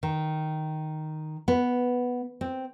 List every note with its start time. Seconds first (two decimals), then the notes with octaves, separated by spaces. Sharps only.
0.03 D#3
1.48 B3
2.41 C4